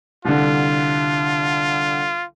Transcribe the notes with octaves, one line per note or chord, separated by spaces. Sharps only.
C2 D3 F4